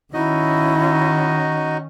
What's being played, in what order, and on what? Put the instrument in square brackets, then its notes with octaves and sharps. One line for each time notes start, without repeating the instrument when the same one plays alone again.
[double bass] D#3 C#4 [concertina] D#4 F#4 D#5 [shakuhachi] E4